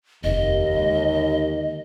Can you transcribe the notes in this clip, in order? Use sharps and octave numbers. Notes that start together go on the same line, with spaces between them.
F1 D#2 D#5
D3 G#3